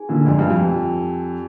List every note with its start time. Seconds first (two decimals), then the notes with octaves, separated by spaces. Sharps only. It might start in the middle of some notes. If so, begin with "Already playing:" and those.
Already playing: D#4 G#4 G#5
0.09 A#2 D3
0.26 F2 G#2 G4 D5 G#5
0.39 G2
0.50 F2